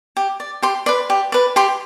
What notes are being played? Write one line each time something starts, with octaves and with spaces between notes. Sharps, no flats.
G4
D5
G4 C6
B4 D5
G4
B4 D5
G4 C6